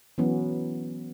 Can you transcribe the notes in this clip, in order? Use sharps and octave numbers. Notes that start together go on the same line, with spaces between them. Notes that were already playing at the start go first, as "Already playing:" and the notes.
E3 F#3 B3 C#4